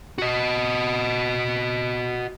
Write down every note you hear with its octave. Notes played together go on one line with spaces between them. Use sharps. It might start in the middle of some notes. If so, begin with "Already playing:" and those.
F#4 D#5